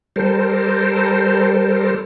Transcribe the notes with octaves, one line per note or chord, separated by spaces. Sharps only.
G3 A4 A#4 C5